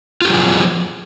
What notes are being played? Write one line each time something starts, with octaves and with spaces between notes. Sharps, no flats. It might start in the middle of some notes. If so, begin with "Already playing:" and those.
F3 F#3 F4 G4 G#4